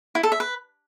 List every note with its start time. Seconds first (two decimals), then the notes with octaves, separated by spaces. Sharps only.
0.15 E4
0.23 A4
0.32 E5
0.40 B4